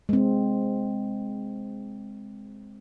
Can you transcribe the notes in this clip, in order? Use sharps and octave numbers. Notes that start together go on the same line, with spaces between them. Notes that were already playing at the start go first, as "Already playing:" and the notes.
G#3 C4